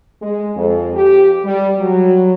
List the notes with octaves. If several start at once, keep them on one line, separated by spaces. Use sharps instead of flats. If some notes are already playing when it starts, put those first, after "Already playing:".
G#3
F2
G4
G3
F#3